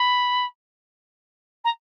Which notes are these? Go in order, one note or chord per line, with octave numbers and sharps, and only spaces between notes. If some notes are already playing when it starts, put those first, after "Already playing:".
Already playing: B5
A#5